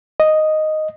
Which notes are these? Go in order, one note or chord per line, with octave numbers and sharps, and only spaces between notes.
D#5